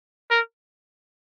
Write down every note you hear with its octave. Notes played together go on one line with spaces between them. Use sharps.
A#4